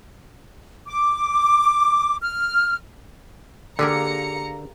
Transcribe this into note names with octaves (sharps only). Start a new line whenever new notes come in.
D6
F6
D3 A#3 G4 G#4 A#4 A#5 C#7